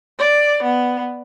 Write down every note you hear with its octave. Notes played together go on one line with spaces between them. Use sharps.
D5
B3